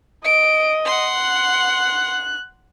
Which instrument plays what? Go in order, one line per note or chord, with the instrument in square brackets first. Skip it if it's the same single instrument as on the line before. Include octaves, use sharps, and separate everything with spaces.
[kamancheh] D#5 [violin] D7
[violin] F#5 C6
[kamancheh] F#6